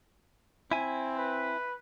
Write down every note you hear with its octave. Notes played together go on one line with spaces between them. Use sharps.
C4 E4 G#5
B4